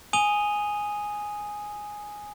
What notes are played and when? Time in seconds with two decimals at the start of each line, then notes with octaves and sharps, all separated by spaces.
0.13 G#5 D#6 D#7 F7 G7